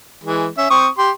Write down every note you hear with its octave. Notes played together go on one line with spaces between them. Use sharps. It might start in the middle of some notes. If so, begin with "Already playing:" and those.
E3 G#3
C#4 E5
C4 C#6 D#6
G4 C6